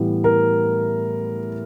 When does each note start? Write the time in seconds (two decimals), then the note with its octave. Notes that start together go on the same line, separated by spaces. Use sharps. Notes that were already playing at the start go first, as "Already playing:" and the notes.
Already playing: A2 E3 G3 B3
0.24 A#4